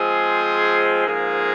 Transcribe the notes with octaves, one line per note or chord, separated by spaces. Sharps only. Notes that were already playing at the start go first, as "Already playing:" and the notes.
Already playing: F3 G#3 C4 G#4
G#2 F3 A#3 G#4